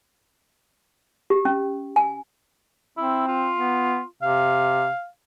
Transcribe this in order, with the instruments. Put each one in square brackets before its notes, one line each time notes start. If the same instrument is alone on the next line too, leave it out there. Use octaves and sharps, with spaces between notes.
[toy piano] G4
C#4
G#5
[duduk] C4 [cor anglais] E4
[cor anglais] F4
[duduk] B3
[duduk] C3 [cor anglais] F5